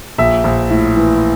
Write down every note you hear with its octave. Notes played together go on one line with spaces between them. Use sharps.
A#1 E5
A#1
A2
E3